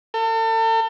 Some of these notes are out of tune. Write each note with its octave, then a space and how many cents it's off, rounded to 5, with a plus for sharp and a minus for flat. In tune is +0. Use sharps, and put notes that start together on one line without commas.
A4 +40